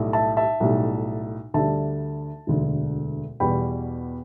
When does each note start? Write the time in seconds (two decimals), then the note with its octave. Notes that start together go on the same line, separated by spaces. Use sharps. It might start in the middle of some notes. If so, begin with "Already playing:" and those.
Already playing: B1 A2 G3
0.13 E5 A5
0.37 E5 A5
0.60 B1 A2 G3
1.54 D2 D3 G3 E5 A5
2.47 E1 D2 D3
3.40 E2 B2 G3 G5 B5